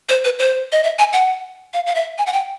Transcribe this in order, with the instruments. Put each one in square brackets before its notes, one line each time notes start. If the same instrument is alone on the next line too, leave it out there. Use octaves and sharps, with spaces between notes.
[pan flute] C5
B4
C5
D#5
E5
G#5
F#5
F5
F5
E5
G#5
F#5
G5